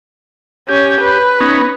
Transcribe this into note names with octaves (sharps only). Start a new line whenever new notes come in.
C#4 G4
B4
B3 C#4 D#4